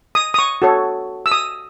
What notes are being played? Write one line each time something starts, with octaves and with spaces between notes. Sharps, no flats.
D#6
D#6
C#6
F#4 A4 C#5
E6
D#6